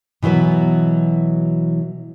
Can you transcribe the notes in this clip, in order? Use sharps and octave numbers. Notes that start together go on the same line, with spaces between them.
B2 E3 F#3 B3 B4